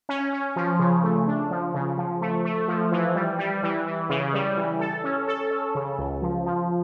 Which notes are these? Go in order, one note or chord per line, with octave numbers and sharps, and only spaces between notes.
C#4
C#4
F3
C#3
A3
D4
F3
C#3
F3
A3
A3
F3
E3
G3
G3
E3
E3
C#3
G3
E3
A4
C#4
A4
C#4
C#3
C#2
F3
F3